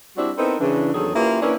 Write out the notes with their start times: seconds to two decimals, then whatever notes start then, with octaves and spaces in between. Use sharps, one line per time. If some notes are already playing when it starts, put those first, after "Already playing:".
0.17 G3 C4 D4 E4 F#4
0.38 B3 C4 D#4 E4 A4 A#4
0.61 C#3 E3 D4
0.94 E2 D#3 F#3 G#4 A4
1.15 A#3 C#4 E4 F4 G4 B4
1.41 A#3 C#4 D4 E4 A#4 B4